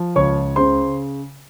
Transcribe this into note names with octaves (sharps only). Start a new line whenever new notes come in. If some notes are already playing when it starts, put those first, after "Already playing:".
Already playing: F3
C#2 C#5 C#6
C#3 C5 C6